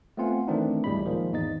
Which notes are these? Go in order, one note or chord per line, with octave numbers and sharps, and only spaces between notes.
A3 B3 C4 F4 F#5 G#5
D#3 E3 A3 C4 D4 D#4
G#1 D2 A2 G3 G#3 B5
D#3 F3 G#3 A#3
G#1 E2 D#4 D#5 A6